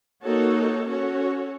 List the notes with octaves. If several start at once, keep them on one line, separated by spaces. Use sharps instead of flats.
A#3 D#4 F#4 A4 C#5
C#4 F#4 A4 C#5